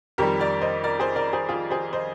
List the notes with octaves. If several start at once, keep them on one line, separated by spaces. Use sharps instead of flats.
F2 D#3 G3 G4 A#4
A#4 D5
C5 D#5
A#4 D5
G#4 C5
A#4 D5
G#4 C5
F4 G#4
G#4 C5
C5 D#5